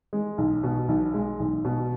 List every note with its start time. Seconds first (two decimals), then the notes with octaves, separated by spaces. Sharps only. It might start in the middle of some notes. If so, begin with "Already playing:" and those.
0.13 G#3
0.38 B1
0.63 B2
0.88 B1
1.14 G#3
1.39 B1
1.65 B2